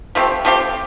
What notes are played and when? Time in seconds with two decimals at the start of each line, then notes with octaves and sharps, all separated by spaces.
0.15 F3 A3 C4 G4
0.45 F3 A3 C4 G4